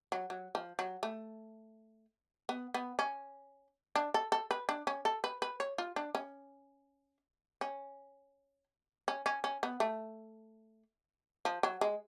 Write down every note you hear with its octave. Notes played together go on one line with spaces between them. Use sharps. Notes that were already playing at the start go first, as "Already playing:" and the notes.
F#3
F#3
F3
F#3
A3
B3
B3
C#4
D4
A4
A4
B4
D4
C#4
A4
B4
B4
C#5
F4
D4
C#4
C#4
C#4
C#4
C#4
B3
A3
F3
F#3
G#3